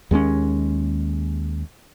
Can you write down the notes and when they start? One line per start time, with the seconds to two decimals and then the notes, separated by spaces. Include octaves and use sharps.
0.11 D#2 G#3 B3 C#4